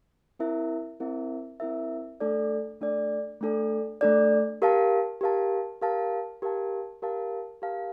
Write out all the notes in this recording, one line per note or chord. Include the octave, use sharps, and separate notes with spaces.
C4 E4 A#4 E5
C4 E4 A#4 E5
C4 E4 A#4 E5
A3 D4 A4 D5
A3 D4 A4 D5
A3 D4 A4 D5
A3 D4 A4 D5
G4 A#4 F5 A5
G4 A#4 F5 A5
G4 A#4 F5 A5
G4 A#4 F5 A5
G4 A#4 F5 A5
G4 A#4 F5 A5